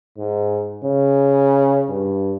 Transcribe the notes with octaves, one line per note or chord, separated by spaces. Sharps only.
G#2
C#3
G2